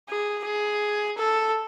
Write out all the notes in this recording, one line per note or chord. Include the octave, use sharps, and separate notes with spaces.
G#4
G#4
A4